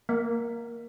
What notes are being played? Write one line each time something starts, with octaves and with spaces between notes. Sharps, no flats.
A#3